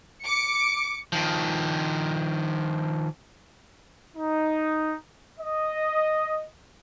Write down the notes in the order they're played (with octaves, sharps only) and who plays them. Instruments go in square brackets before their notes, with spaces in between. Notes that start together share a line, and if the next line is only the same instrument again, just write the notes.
[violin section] D6 C#7
[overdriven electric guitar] D#3 F3
[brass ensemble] D#4
D#5